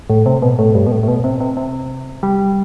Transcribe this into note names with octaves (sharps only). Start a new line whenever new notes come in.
A2
C3
B2
A2
G2
B2
A2
A2
B2
C3
C3
C3
G3